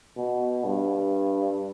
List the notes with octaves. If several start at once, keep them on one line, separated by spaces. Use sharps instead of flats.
B2
G2